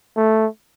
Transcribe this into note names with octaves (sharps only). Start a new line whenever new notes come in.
A3